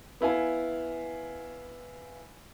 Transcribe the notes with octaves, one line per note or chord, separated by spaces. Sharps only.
B3 E4 F5 G#5